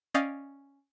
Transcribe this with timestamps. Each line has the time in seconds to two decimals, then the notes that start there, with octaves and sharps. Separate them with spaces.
0.14 C#4 D5 D#5 F5 G5